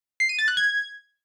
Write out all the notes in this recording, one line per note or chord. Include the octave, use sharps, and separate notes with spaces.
C7
D#7
A6
F#6
G#6